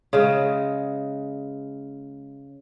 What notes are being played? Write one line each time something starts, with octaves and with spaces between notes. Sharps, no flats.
C#3 G#3